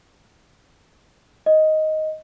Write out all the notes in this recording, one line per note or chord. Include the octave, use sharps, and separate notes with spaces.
D#5